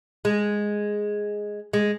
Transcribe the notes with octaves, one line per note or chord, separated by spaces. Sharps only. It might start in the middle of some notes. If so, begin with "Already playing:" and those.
G#3
G#3